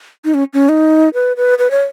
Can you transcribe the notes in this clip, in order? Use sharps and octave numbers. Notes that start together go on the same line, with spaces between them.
D#4
C#4
C#4
D#4
B4
B4
B4
C#5